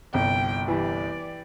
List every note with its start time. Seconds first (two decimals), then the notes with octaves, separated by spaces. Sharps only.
0.14 G1 C2 G5
0.68 E3 G4 D5